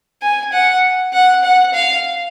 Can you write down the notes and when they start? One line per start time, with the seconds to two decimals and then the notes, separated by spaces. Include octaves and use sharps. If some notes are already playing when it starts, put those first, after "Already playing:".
0.22 G#5
0.53 F#5
1.13 F#5
1.44 F#5
1.74 F5